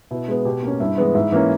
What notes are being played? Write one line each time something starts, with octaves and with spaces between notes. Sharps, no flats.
B2 E4
G#3 B3
B2 G4
A#3 C#4
G2 E4
E3 G#3 B3
G#2 E4
E3 A#3 C#4